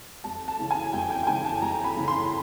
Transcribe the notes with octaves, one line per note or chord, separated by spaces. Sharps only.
F2 A5
A5
C#3 E3
G#5
F2 G5
G5
G5
C#3 E3 G#5
A5
F2 A#5
B5
C#3 E3
B5
C6